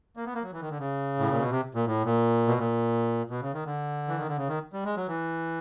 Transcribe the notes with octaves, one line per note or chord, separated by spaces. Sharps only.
A#3
B3
A#3
F#3
E3
D#3
D3
C#3
A2
A#2
B2
C3
A#2
A2
A#2
B2
A#2
B2
C#3
D#3
D3
E3
D#3
D3
C#3
D#3
G3
G#3
F#3
E3